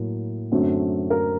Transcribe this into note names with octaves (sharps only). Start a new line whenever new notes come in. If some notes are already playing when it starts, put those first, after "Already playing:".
Already playing: A2 F#3 A#3
F#2 D3 F#3 A3 C4
A#4